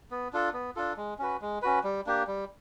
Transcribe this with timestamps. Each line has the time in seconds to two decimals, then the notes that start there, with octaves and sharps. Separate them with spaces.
0.11 B3
0.33 D4 F4 A4
0.53 B3
0.76 D4 F4 A4
0.97 G#3
1.19 C#4 F#4 B4
1.41 G#3
1.62 C#4 F#4 B4
1.83 G3
2.06 A#3 D4 G4
2.27 G3